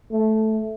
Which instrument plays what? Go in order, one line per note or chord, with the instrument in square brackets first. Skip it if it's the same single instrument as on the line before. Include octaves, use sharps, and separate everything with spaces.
[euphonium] A3